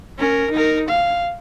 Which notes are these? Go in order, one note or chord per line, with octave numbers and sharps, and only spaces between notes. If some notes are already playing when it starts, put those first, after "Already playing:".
C#4 A#4
D#4 A#4
F5